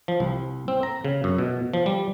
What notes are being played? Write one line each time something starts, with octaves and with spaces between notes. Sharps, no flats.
F3
C2
C4
A#5
C#3
F#2
B2
F3
G3